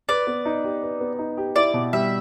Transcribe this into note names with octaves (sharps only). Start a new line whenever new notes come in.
B4 D5
B3
D#4
G4
B4
B3
D#4
G4
E4 D5
B2
G3 E5